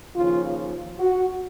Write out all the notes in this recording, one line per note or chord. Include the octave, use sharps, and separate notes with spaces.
D#2 C#3 F3 F4
F#4